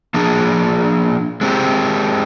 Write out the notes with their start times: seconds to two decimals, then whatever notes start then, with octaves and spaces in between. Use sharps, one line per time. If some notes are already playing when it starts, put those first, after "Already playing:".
0.14 F3 A#3 D4 G#4
1.41 G#3 C4 G4